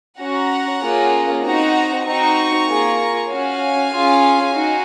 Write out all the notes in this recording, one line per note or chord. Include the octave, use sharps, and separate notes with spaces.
C#4 F#4 F#5 A#5
A#3 C#4 F4 G#4
C4 D#4 F#4 F#5 A#5
C4 D#4 F#4 A#5 C#6
A#3 F4 G#4
C#4 F#4 F5 G#5
C#4 F4 G#4
D#4 F#4